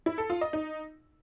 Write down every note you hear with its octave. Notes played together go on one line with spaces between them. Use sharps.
E4
A4
F4
D#5
D#4